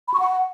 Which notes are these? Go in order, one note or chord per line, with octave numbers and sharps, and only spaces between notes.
B5
C#6
F#5